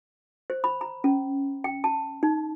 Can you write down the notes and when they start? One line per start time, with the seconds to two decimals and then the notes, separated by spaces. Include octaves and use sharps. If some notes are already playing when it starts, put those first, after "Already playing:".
0.50 C5
0.64 B5
0.81 A#5
1.04 C#4
1.64 G5
1.84 A5
2.23 D#4